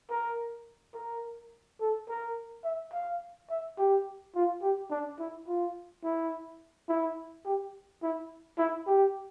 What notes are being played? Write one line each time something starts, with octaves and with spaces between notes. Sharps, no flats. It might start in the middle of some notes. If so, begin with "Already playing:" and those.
A#4
A#4
A4
A#4
E5
F5
E5
G4
F4
G4
D4
E4
F4
E4
E4
G4
E4
E4
G4